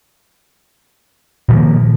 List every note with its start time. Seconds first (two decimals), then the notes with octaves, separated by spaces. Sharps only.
1.48 A#2
1.51 F3
1.53 D#3
1.56 A#3